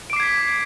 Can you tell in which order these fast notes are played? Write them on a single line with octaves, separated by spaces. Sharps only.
D7 D6 C7 G#6 B6